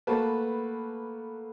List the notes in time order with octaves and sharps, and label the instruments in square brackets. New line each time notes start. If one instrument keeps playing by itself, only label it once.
[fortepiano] A3 A#3 F#4 B4 A5